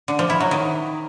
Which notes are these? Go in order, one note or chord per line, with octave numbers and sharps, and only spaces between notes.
D3
F3
E4
F#3
D#3